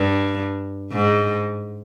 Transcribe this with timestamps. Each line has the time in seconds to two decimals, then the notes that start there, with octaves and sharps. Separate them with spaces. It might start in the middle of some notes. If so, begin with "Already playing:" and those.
Already playing: G2
0.92 G#2